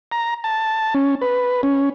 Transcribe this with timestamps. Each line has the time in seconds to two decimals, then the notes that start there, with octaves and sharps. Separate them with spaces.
0.12 A#5
0.44 A5
0.95 C#4
1.21 B4
1.63 C#4